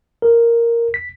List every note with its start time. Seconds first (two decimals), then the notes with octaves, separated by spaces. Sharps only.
0.22 A#4
0.94 B6